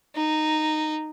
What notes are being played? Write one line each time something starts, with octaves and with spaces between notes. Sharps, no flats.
D#4